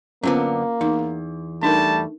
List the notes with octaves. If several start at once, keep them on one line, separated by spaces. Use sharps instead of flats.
F#2 D3 A#3 B3 C#4 F4 C5
E2 D#4
G3 A3 D4 D#4 A#4 A5